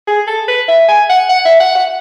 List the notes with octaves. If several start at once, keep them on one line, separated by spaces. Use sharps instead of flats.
G#4
A4
B4
E5
G#5
F#5
F#5
E5
F#5
F#5